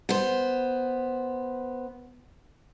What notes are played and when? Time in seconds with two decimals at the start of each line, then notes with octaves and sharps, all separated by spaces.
0.09 B3 C5